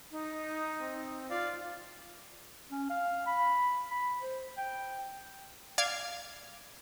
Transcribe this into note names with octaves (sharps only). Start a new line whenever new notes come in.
D#4
C4
F4 D5 F5
C#4
F5
B5
B5
C5
G5
D5 F5 G#6